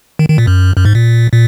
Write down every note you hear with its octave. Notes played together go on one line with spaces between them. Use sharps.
D#3
D#3
A#2
F#2
F#2
G#2
A#2
A#2